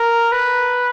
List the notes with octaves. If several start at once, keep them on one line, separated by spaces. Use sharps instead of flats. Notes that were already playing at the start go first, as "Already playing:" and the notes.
Already playing: A#4
B4